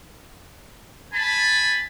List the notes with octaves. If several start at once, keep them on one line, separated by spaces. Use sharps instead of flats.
G#5 A5 B5